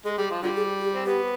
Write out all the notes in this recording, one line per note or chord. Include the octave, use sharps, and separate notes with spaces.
G#3 G#4
G3 G#4
F3
D3 G3 F4
G#4
G4
C4
B3 G4